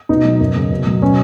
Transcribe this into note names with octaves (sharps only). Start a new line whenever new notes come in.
B2 D#4
F#3
F#2
C#3
B2
F#3
B2 C#4